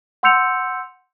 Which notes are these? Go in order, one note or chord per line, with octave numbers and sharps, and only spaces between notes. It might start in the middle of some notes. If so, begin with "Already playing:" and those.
F#5 C6 E6 G6 C#7 F7